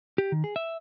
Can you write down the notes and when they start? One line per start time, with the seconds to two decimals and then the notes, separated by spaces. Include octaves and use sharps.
0.18 G4
0.32 D#3
0.44 G#4
0.56 E5